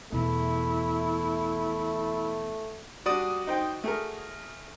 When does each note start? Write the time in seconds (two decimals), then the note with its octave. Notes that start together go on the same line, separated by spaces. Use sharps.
0.12 E2 B2 A3 E4
3.06 G3 D4 F#4 D5 D#6
3.47 D#4 C5 G5
3.84 A3 G#4 A#4